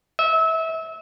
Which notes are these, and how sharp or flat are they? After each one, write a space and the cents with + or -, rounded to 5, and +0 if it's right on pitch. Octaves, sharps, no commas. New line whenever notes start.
E5 -30